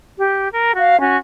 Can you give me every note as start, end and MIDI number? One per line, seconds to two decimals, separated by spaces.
0.18 0.48 67
0.53 0.72 70
0.76 0.98 66
0.76 0.98 77
0.99 1.16 61
0.99 1.16 66